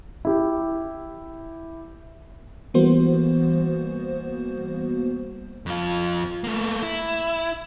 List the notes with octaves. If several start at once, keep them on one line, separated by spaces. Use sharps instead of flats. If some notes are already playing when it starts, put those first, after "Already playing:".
E4 G4
E3 G3 A#3 B3 F#4 C5
F2 F4
A3 A#3
E4